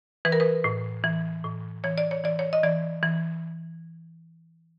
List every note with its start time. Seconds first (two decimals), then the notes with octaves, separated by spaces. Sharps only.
0.25 E3 B4
0.32 A#4
0.40 B4
0.64 A2
1.04 E3
1.45 A2
1.84 E3 C#5
1.98 D5
2.11 C#5
2.24 E3 D5
2.39 C#5
2.53 D#5
2.63 E3 D5
3.03 E3